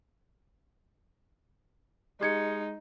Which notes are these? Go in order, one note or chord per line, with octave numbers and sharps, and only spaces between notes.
G#3 D#4 G4 G#6 C#7